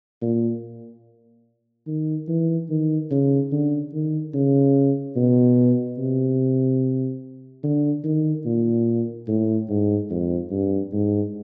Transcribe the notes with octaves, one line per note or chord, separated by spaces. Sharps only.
A#2
D#3
E3
D#3
C#3
D3
D#3
C#3
B2
C3
D3
D#3
A#2
A2
G#2
F2
G2
G#2